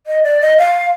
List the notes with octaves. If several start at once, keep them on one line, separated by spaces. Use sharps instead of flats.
D#5
D5
D#5
F5